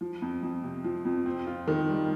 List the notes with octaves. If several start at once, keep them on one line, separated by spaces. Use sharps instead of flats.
F3
F2
F2
C3
F3
F2
C4
F4
D#3
G3